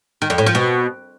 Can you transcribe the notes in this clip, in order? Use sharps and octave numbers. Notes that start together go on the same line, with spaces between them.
D#3
F2
A2
F3
B2